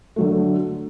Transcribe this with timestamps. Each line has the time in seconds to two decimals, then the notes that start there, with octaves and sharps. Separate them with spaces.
0.16 D3 F#3 A3